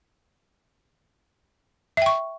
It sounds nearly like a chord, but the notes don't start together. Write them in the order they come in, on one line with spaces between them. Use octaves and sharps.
E5 G5 C#6